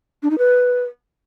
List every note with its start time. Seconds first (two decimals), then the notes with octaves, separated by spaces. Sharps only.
0.23 D4
0.30 D#4
0.38 B4